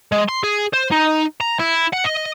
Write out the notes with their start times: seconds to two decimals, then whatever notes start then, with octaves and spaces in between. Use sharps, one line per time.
0.12 G#3
0.28 C6
0.43 G#4
0.73 C5
0.91 D#4
1.41 A#5
1.60 E4
1.93 F#5
2.05 D#5